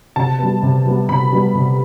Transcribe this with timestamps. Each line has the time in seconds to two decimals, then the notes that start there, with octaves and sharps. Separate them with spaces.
0.16 C3 A5
0.39 G3 B3
0.63 C3
0.86 G3 B3
1.09 C3 B5
1.32 G3 B3
1.55 C3